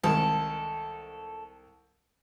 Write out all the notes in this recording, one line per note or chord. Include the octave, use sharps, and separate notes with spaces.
C2 D#3 G#3 A4